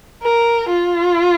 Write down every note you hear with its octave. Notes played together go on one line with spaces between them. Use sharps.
A#4
F4